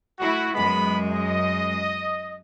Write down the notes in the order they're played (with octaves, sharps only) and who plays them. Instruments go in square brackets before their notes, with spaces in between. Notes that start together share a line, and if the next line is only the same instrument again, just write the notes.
[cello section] A3 E4 [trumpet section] F#4
[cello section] F#2 G#3 [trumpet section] B3 B5
[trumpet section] D#5